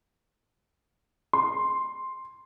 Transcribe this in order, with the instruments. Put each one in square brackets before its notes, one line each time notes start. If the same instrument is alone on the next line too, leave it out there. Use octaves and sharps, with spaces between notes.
[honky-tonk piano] C6